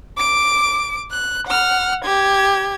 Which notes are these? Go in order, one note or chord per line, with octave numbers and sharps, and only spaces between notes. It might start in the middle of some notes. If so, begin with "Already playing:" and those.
D6 D7
F#6
F#5 F6
G4 G#6